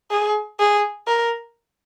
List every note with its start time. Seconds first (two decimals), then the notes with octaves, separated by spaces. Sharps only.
0.11 G#4
0.59 G#4
1.08 A#4